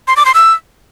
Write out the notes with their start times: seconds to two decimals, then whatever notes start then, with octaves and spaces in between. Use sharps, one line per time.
0.08 C6
0.17 D6
0.25 C6
0.34 E6